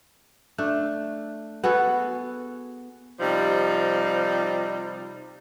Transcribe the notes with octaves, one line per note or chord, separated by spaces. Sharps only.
A3 D4
B3 F#4 G#4 A4
C3 F3 G3 D#4